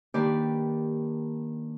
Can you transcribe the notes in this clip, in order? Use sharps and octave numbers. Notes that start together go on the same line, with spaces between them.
D#3 A#3 D4 G4 B4 D5